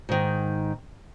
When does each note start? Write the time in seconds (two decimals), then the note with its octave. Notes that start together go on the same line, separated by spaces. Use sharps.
0.09 G#2 D#3